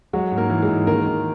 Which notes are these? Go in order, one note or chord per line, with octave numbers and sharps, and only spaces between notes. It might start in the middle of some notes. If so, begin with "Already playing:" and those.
F#3 G#3 F#4
G#2
A#3 A#4
E3
G#3 G#4
G#2
D#3 A#3 A#4
D#3